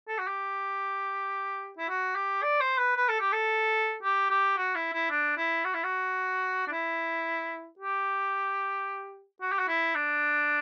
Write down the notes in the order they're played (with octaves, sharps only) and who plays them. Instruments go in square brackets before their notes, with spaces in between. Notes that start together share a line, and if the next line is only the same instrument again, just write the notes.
[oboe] A4
F#4
G4
E4
F#4
G4
D5
C5
B4
B4
A4
G4
A4
G4
G4
F#4
E4
E4
D4
E4
F#4
E4
F#4
D4
E4
G4
F#4
G4
F#4
E4
D4